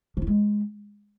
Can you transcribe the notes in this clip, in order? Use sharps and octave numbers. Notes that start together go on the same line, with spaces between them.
F3
E4
G#3